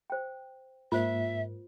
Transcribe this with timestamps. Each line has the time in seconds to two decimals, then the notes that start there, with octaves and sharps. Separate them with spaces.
0.10 C5 G5
0.92 G#2 A#3 F4 C5 E5